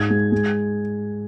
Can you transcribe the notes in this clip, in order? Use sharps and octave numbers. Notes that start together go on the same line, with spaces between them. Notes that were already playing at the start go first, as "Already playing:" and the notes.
Already playing: G#2 G#6
G#3
G#3